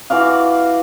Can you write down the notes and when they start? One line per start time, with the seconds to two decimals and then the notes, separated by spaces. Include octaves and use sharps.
0.10 E3 F#4 D5 F5